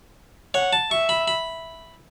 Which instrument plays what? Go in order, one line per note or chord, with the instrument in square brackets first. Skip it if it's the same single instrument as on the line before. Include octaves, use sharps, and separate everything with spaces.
[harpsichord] C#5 [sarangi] F#5
[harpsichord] A5
[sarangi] E5 [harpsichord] C#6
[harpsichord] B5
B5